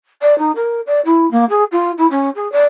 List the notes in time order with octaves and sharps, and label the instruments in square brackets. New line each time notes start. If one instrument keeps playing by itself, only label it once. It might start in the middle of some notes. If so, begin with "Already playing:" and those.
[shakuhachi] D5
D#4
A#4
D5
E4
A#3
G#4
F4
E4
C#4
G#4
D5